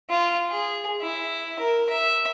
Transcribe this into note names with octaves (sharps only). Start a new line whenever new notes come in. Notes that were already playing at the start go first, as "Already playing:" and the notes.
F4
G#4
E4
A#4
E5